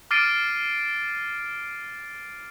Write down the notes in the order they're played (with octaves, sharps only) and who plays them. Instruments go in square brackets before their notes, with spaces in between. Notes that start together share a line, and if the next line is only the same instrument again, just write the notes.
[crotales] D6 F6 A6 C7 D7 D#7